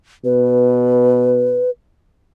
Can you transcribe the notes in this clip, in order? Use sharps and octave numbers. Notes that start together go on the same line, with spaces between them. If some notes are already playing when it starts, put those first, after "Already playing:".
B2 B4